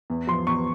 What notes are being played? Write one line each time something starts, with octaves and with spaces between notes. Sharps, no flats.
E2
F3 C6
E2 C#6